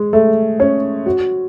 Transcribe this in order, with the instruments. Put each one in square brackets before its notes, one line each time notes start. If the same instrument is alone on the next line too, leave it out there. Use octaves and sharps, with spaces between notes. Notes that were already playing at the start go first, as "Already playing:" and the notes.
Already playing: [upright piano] G#3
A3
C#4
F#4